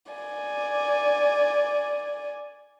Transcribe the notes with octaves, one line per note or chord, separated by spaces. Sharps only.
D5 G#5